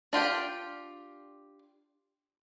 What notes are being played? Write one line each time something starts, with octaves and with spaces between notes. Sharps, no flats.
D4 F4 G4 G5